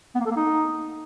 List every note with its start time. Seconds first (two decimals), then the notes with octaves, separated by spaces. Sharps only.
0.15 B3
0.20 A#3
0.26 A4
0.31 A#3
0.36 D#4